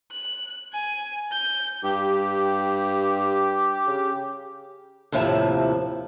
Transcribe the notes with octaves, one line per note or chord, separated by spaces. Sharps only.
F#6
G#5
G6
G2 G4
C#3
D#2 A2 C3 F3 E4 A5